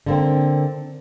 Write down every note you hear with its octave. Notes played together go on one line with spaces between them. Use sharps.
D3 A#3 C4